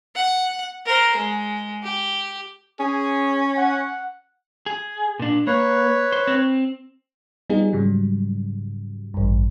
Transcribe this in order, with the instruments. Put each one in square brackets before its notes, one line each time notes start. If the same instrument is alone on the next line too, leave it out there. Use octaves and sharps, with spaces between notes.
[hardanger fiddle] F#5
A#4 C5
G#3
G4
[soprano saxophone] C#4 [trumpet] G#4
[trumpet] F#5
[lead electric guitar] G#4
A#2 D4
[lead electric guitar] A#3 [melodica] B4 C#5
[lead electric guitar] C5
C4
[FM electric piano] G3 B3 D#4 F4 G#4
G#2 C#3 F#3 G3
A1 G2